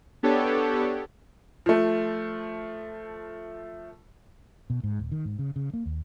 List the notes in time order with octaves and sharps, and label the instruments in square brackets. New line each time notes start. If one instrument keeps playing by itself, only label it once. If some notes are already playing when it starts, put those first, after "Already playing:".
[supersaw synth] B3 D4 G4 A4 C#5
[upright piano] F3 A3
[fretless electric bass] B2
G#2
D#1
D#3
G#2
C#3
C#3
A#3
D#2